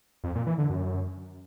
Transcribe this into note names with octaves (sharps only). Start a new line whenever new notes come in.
F2
A#2
E3
D3
F#2